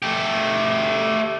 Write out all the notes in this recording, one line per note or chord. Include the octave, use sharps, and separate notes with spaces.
A3 G4